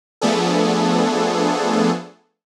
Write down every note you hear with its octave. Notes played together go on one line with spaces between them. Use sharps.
F3 A3 B3 D4 G#4 A4